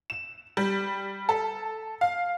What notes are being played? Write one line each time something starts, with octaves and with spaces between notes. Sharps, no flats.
E7
G3
A4
F5